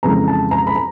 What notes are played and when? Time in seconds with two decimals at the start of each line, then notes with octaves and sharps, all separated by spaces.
0.03 F2 C#3 E3 G#3 A#5
0.28 A5
0.51 A#5
0.67 B5
0.76 A#5